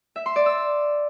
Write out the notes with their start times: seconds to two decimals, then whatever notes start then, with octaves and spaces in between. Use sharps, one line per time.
0.16 E5
0.26 C6
0.36 D5
0.46 E6